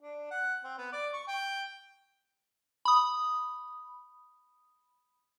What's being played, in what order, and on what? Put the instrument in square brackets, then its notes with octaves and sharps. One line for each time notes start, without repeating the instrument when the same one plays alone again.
[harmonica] D4
F#5
C4
B3
D5
C#6
G5
[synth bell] B5 D#6